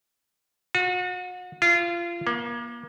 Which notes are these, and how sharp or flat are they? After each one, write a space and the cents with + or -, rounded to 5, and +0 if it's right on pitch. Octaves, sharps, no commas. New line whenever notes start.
F#4 -35
F4 -25
A#3 +35